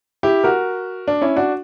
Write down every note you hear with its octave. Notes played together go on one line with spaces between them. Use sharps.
E4 G4
F#4 A#4
D4
C#4 E4
D4 F#4